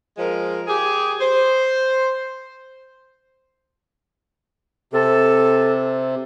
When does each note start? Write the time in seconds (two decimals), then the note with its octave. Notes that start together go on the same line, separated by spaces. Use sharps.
0.18 F3 G#3 A#4
0.68 G4 G#4
1.21 C5
4.93 C3 A4